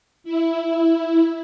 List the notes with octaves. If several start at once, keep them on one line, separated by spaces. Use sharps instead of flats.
E4